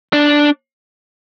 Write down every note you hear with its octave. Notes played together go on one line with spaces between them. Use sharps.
D4